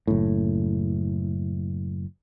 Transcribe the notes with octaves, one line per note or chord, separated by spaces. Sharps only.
F#1 A2